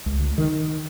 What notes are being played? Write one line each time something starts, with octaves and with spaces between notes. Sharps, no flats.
C#2
D2
D#3